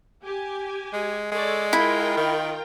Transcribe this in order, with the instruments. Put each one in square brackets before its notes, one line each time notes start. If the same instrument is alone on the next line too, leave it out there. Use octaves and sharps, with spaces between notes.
[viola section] G4 G#5
[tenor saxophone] G#3
[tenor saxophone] G#3 [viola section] A4 C#5 D5
[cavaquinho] E4 [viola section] F4 A#4 G5
[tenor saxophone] D#3